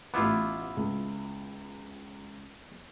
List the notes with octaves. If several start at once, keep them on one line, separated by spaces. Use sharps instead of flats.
A1 B3 E4 F4 D6
C#2